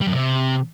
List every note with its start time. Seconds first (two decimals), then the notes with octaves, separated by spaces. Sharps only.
0.01 G3
0.07 F#2
0.13 C3